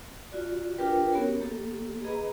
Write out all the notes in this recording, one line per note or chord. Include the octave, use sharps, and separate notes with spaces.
F4 F#4 D5
D4 F4 G4 A#4 B4 G5
B3 C#4 F#4 G4 A#4 C#5
A#3 G4 A4
G#4 B4 D#5 A#5 B5